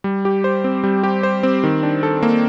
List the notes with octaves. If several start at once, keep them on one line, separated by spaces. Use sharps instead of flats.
G3
G4
C5
C4
G3
G4
C5
C4
D#3
D4
A4
A#3